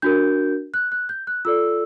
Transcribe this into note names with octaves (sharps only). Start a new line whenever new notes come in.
D4 F#4 A#4 G6
F#6
F#6
G6
F#6
F4 A4 D5 E6